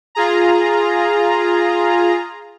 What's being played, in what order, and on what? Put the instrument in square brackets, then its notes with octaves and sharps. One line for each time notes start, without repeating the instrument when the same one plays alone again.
[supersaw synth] F4 G#4 A#5